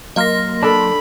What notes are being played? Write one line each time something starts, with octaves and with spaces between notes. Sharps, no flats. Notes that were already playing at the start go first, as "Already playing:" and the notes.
F#3 A#3 D#5 C6 F6 A#6
D4 A4 B5